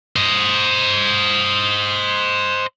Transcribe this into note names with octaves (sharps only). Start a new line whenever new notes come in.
C5 D#5